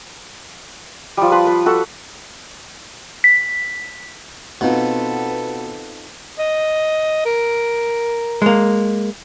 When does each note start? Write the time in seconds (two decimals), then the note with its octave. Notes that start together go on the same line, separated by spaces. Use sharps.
1.17 F3 G3
1.32 B4 A5 B5 C6
1.47 B4
1.66 F#4 A4
3.24 B6
4.61 B2 B3 C4 D#4 F4 A4
6.38 D#5
7.25 A#4
8.42 G#3 A#3